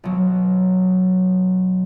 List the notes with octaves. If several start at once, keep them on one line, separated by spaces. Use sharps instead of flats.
B1 F#3